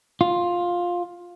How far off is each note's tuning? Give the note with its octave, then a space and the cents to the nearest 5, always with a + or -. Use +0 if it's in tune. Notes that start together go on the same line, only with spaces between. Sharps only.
F4 +10